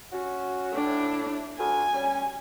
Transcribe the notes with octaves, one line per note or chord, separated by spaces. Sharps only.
C#4 F#4
A2 D4
D2 G#5
G3 C#4